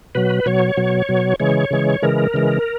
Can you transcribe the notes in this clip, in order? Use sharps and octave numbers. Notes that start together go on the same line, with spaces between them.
B2 F#3 B4
B2 F#3 C#5
B2 F#3
B2 F#3
C#3 E3 G#3 C#5
C#3 E3 G#3
C#3 E3 G#3 A#4
C#3 E3 G#3